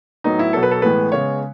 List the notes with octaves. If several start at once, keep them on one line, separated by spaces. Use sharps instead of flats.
A2 F#3 B3 D#4
E4
B2 F#3 B3 A4
B4
A4
A2 E3 G#3 B3 B4
C#3 G#3 B3 C#5